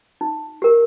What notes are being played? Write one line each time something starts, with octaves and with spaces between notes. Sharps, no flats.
D#4
G4 A#4